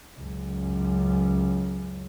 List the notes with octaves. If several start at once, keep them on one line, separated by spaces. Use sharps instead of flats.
C#2 F#2